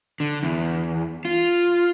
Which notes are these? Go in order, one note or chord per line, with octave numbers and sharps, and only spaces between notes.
D3
E2
F4